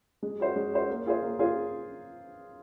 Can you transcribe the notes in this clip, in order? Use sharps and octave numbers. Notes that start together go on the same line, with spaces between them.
G#3
C#4 F#4 C5
G#3
C#4 F#4 C5
A#3
F4 G#4 C5
A#3
F4 G#4 C5